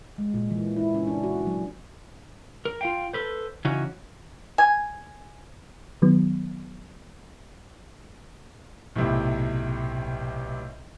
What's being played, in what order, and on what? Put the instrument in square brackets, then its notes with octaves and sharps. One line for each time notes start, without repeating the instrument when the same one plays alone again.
[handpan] G#3
A#2
E3
E4
C#4
D4
F#4
F#3
[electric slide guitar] A#4
F4 F5 G5
A4 B4 C5
C#3 E3 C#4 D#4 F#4
[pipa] G#5
[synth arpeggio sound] D#3 F#3 B3
[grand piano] B1 A2 C3